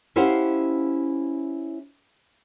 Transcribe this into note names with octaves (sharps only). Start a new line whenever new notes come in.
C#4 E4 G4 C5 F5 F#5